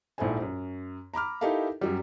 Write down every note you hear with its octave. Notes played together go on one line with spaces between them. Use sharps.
A#1 G#2 E4 A4 C5 G#5
F#2
A#5 B5 D6 F6
D#4 E4 G4 A4 A#4 F5
F#2 F#3 G3